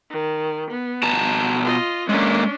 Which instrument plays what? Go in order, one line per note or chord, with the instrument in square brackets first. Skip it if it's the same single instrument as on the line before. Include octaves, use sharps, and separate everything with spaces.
[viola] D#3
B3
[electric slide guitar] B2 A5 A#5
[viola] F4 D#5
[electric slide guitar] G#3 A#3 [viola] C#4 D4